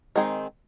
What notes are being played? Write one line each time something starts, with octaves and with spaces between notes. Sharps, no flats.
D#3 G#3 C4 D#4 G#4